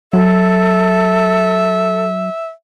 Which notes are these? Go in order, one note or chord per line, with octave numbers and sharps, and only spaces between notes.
F#3 A4 E5